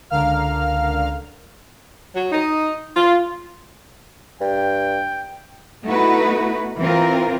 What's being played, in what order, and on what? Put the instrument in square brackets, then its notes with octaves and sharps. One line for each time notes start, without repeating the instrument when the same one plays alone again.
[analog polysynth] C#2 D3 A#4 F5 F6
[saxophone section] F#3
D#4
F4
[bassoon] G2 [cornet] G5
[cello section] A3 B3 D#4 E4 F#4 B4
E3 C4 F4 A#4